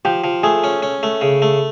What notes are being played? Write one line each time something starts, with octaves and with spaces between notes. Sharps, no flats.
F3 G4
F3
A3 G#4
C#4
C#4
A3
C#3
A3